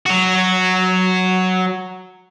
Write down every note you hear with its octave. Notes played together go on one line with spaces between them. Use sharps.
F#3 F#4